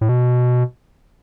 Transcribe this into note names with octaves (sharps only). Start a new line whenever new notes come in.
A2
B2